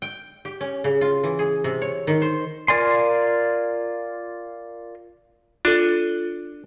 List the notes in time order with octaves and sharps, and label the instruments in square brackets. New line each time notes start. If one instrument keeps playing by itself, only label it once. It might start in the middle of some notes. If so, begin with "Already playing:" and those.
[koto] G5
G4
C#4
C#3
F4
E3
G#4
C3
C#5
D#3
C5
[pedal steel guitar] F4 A#4 D5 G#5 C6
[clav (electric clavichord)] D4 [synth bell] F4 A4